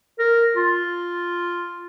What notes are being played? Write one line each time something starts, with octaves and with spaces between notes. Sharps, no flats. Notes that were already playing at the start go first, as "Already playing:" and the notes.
A#4
F4